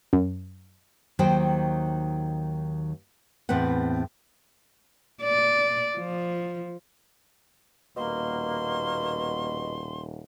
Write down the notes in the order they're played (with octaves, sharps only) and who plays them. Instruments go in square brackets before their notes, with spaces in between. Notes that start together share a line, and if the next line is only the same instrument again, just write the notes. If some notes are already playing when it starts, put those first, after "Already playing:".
[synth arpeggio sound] F#2
[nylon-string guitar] D#2 D#3 F#3 D#4 C5 G5
E2 A2 C4 B4 F#5
[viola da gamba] D5
F3
[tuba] D#1 [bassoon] B2 [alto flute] A#3 [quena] C6